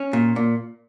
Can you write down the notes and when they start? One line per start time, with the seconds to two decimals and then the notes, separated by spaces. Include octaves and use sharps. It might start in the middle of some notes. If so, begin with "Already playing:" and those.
Already playing: C#4
0.13 A#2
0.36 A#2